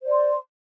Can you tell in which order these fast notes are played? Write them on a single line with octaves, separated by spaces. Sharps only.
C5 D5 C6